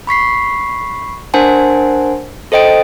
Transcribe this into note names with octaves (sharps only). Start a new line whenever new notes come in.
B5 C#6 B6 C7
D4 A#4 C5 F#5 G#5 A5
A4 C5 D#5 G5 D7